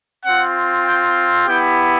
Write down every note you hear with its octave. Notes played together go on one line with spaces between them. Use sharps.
C4 F4 F#5
G5
B3 E4 G4 G5